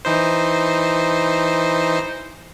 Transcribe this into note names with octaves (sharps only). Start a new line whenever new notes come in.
E3 D#4 C5